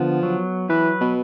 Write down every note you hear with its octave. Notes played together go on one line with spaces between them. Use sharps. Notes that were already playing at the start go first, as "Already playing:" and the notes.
Already playing: D3 F3 B3
F#3
E3 B4
B2